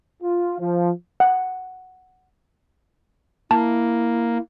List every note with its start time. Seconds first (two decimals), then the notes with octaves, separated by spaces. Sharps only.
0.23 F4
0.60 F3
1.20 F#5
3.51 A#3 E4 A5